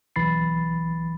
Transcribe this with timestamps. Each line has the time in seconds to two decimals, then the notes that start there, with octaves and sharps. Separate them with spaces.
0.16 B1 E3 B5 A6 C7